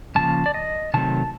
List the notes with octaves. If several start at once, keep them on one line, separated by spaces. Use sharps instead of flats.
F#2 C#3 F3 A#3 A5
D5
D#5
C3 D#3 F#3 A3 C4 A5